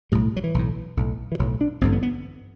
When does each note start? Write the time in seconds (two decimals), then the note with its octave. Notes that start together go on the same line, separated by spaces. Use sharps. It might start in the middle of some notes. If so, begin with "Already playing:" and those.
0.12 B1 A2 G3
0.36 F#3
0.44 E3
0.54 B1 A2
0.97 B1 A2
1.32 E3
1.39 B1 A2 F#3
1.61 D4
1.81 A1 G2 D3 C4
1.92 B3
2.03 B3